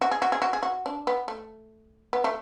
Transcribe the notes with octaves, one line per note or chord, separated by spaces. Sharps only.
F#4
G#4
F#4
G#4
F#4
G#4
F#4
D4
B3
A3
B3
A3